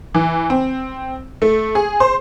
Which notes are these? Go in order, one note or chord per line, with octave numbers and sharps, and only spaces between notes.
E3
C4
A3
G#4
C5